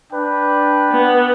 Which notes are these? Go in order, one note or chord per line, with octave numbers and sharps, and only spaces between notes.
D4 B4 G5
B3